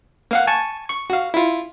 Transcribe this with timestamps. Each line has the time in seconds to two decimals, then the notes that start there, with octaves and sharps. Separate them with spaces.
0.31 A#3 F5 F#5
0.47 G#5 A5 C#6
0.90 C#6
1.10 F#4 F5
1.34 E4 F4